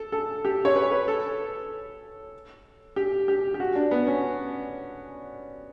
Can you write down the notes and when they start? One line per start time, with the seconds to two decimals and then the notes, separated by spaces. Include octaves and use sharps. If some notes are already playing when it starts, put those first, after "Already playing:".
Already playing: A4
0.12 A4
0.45 G4
0.65 C#5
0.76 B4
0.91 B4
1.08 A4
2.96 G4
3.28 G4
3.54 G4
3.60 F#4
3.75 D4
3.91 B3
4.07 C#4